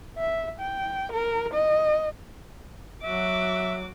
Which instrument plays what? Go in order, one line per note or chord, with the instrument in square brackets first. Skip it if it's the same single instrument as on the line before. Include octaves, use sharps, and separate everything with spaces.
[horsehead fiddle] E5
G5
A#4
D#5
[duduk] F#3 [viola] F#4 D6 [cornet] E5